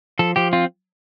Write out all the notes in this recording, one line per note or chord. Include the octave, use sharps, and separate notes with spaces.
F3 A4
F3 G4
C4 F4